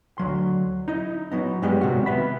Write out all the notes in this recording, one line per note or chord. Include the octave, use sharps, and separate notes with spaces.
D2 F#3 C6
D#4 E4 D#5
F#3 B3 D#4
G2 G3 G#3 B3 G4 D#5
B1 C3 D#3 F#4
B3 E5 B5